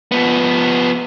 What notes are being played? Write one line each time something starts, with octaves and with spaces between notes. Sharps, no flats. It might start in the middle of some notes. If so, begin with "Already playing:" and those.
F3 B3